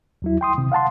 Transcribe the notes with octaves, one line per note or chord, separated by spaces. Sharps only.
D#2 F#3 E4
G5 C6 D#6
C3 D#3
F5 F#5 A5 C6